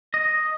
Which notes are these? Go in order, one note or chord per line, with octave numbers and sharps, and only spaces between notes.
D#5